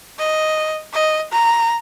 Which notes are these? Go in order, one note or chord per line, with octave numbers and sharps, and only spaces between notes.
D#5
D#5
A#5